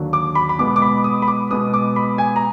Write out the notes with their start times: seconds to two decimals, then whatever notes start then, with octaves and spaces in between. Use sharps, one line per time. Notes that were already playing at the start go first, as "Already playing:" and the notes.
Already playing: D#2 D3 F#3 D4
0.13 D6
0.35 B5
0.49 B5
0.59 B2 G#3 B3 D6
0.76 D6
0.82 B5
1.04 D#6
1.22 B5
1.28 D6
1.51 B2 G#3 B3 D#6
1.74 D6
1.96 B5
2.18 G#5
2.36 A#5